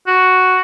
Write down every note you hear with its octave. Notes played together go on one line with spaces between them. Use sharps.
F#4